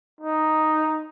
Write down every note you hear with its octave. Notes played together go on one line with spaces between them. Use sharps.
D#4